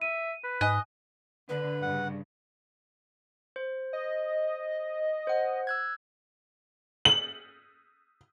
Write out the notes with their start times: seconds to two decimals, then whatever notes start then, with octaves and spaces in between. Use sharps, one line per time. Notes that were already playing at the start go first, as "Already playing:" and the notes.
0.02 E5 D#7
0.44 B4
0.61 G#2 D#5 G#5 F#6
1.49 D3 B4
1.82 G2 C#3 F#5
3.56 C5
3.93 D#5
5.27 C5 F#5
5.67 E6 F#6 G#6
7.05 F#7